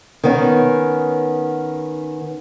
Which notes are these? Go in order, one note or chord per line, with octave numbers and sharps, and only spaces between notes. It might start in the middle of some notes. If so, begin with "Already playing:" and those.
D#3 B3 C#4